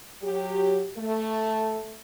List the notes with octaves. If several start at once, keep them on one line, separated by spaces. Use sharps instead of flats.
F#3 G4
A3